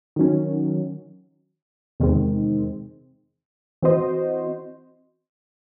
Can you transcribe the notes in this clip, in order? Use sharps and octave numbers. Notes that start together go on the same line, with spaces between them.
D#3 F#3 C#4
E2 C3 D#3 G#3 C4
E3 C4 F#4 C5 D#5